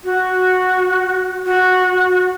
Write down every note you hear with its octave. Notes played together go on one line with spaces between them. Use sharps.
F#4
F#4